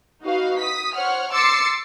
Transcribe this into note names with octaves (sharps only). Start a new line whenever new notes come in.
D#4 F#4 B4 D#5 F5
D#6 B6
C5 C#5 F#5 F6
C6 D6 E6 A6 C7 C#7